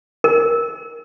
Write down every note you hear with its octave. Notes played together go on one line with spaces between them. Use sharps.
A#4